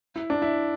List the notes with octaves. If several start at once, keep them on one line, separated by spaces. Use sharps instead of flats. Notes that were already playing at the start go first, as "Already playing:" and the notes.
E4
D4
E4